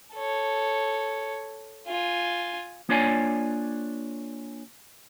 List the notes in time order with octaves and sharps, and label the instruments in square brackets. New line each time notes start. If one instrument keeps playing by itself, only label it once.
[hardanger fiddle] A4 C#5
F4 G#5
[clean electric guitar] A#3 D4 F4 C#5 D5 G#5